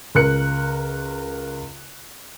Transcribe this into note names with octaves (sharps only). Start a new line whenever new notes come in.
C#2 A#4 F#6 C#7